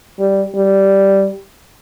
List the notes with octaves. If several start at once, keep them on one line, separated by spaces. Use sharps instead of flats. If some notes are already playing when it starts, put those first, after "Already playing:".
G3
G3